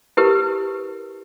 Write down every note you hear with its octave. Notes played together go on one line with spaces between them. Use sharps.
E4 G4 A#4 B4